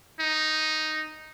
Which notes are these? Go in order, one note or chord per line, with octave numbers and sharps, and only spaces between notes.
D#4